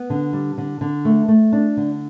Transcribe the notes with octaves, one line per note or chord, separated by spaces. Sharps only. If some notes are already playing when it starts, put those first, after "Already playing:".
Already playing: B3
D3
G3
D3
D3
A3
A3
D4
D3